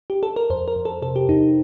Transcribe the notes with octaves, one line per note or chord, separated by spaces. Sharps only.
G4
A4
A#4
F2 C5
A#4
F2
A4
C3 A4
G4
F2 D#4